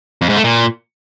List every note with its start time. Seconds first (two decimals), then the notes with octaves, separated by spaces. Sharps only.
0.22 F2
0.29 G#2
0.37 A3
0.44 A#2